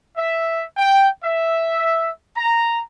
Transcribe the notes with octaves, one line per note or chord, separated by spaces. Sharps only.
E5
G5
E5
A#5